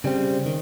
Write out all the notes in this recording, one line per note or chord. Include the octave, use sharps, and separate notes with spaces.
C#3 G3 C4
D#3